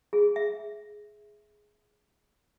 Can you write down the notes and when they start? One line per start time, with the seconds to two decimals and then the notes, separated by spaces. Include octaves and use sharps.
0.13 G#4
0.36 E5